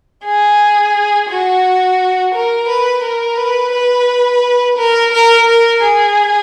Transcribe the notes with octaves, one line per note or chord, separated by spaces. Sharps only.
G#4
F#4
A#4
B4
A#4
B4
B4
A#4
A#4
A#4
G#4